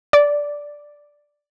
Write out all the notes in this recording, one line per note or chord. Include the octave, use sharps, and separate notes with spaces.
D5